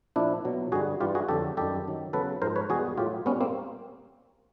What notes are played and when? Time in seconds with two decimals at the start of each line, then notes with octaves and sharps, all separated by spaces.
0.16 A#2 F3 D4 E4
0.45 B2 F#3
0.72 G2 D3 G3 F#4 G#4
1.01 G2 E3 G3 F4 G4
1.15 F#4 G#4
1.29 F2 D3 F#3 G4 A4
1.57 F#2 D#3 G3 G4 A4
1.85 F#2 D#3 F#3
2.13 E2 C#3 F#3 A4 B4
2.42 G#2 F3 A#4 C5
2.56 B4 C#5
2.69 E2 B2 G3 F#4 G#4
2.97 A2 F#3 F4 G4
3.26 G3 B3 C#4
3.31 A#2
3.41 A#3 C4